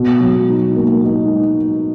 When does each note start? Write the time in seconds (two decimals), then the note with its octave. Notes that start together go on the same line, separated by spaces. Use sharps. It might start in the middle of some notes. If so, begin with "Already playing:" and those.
Already playing: B2
0.20 F#3
0.49 D#4
0.76 A#3
1.05 D#4